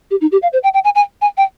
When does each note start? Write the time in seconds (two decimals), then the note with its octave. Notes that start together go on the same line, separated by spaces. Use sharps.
0.11 G4
0.21 D#4
0.32 G4
0.42 F5
0.53 C5
0.63 G5
0.74 G5
0.84 G#5
0.95 G#5
1.21 G#5
1.37 G5